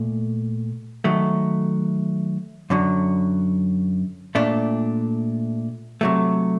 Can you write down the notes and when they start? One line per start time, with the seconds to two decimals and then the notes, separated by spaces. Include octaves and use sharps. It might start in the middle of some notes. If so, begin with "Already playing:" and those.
Already playing: A#2 A3
1.04 D#3 F#3 A3
2.70 F#2 D3 F#3
4.35 A#2 A3 D4
6.01 C3 F#3 A3